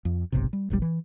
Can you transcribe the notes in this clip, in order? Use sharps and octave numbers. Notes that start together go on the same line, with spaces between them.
F2
F#1 B1 G#2 C3
G3
E1 A#1 A2 G3
E3